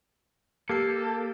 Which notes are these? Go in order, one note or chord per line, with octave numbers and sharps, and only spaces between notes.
A#3 G4 A4 E6 C7